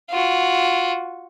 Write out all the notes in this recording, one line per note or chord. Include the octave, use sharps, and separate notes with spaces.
F4 F#4